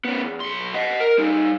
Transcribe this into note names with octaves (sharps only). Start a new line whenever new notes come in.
B3 C#4
E2
B1 C6
D#5 F#5
A#4
G3 D#4